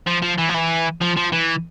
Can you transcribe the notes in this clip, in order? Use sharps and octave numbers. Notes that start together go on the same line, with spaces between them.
F3
F3
E3
F3
E3
F3
F3
E3